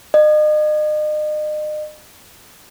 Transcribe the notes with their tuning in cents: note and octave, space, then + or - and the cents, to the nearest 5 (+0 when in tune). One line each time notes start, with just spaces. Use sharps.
D#5 -40